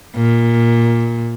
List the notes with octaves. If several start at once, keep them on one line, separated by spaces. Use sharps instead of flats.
A#2